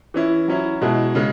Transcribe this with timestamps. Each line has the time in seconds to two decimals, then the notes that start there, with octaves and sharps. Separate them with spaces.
0.14 E3 C#4 E4
0.48 F#3 C#4 E4
0.81 B2 G#3 E4
1.15 C#3 G#3